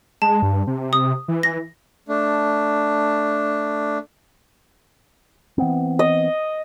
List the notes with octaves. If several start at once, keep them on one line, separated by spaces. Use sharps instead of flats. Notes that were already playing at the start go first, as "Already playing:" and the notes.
G#3 A5
G2
C3
D#6
E3
A#6
A3 D4
E3 B3 C4
D#5